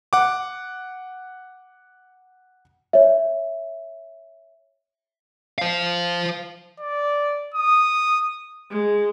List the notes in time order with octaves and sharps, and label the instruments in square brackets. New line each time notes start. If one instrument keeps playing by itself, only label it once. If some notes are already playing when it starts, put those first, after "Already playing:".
[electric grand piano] F#5 D6
[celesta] C#5 E5
[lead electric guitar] C5 F5
[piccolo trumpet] D5
D#6
[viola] G#3